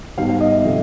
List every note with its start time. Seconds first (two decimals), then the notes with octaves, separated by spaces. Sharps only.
0.17 G#2 D#3 G3 B3 F5
0.29 F5
0.40 D#5
0.52 E5
0.64 C3 F3 A3